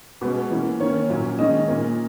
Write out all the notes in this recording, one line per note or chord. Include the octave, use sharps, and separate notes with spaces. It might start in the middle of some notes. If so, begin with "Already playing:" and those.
B2 G#3 C#4 B4
E3 A#3 C#4
D#3 A#3 C#4 C#5
A#2 F#3 C#4
D#3 G#3 C#4 D#5
A#2 A#3 C#4